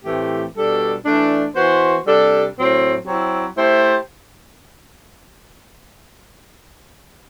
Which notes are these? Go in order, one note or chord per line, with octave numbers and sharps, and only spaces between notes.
A2 E3 A3 C4 G4
B2 G3 D4 A4
E3 A3 D4
E3 B3 F#4 C5
C3 G3 D4 A4
A2 F#3 C4
F#3 C4 E4
A3 E4 G4 C5